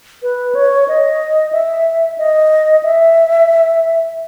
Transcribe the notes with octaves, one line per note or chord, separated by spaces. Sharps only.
B4
C#5
D#5
E5
D#5
E5